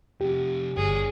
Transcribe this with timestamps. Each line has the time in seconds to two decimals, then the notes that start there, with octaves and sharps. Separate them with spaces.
0.21 F2 C3 G4
0.77 G1 D4 G#4 C#5